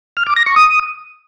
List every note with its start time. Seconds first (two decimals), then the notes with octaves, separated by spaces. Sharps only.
0.17 F6
0.27 D6
0.36 A#6
0.46 C#6
0.56 D#6